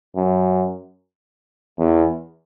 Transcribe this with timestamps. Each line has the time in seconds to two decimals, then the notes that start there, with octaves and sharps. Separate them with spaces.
0.16 F#2
1.79 E2